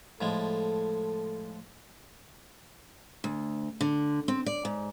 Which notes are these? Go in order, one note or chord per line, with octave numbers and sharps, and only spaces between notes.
A2 F3 G#3 A4
D2
D3
C4
D5
G#2